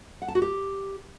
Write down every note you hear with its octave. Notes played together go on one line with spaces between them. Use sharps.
F#5
A5
F#4
G4